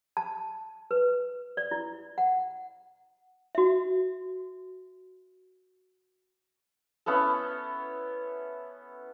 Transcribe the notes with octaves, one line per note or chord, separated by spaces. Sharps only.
A5
B4
D5
E4
F#5
F#4 E5
B3 C#4 E4 A4